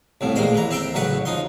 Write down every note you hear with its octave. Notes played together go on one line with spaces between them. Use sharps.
C2 A2 F3
A1 A#2 G#3 C5
E3 A#5
C4 E5 G5 A#5
A1 F#2 C#3 B4 F#5
F3 D#4 C6